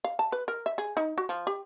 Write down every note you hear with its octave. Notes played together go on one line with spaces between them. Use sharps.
F5
A5
B4
A#4
E5
G#4
D#4
F#4
F3
G4